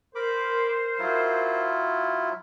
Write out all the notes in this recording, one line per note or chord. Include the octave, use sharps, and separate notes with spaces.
A#4 C5 B5 D6
F#3 E4 F4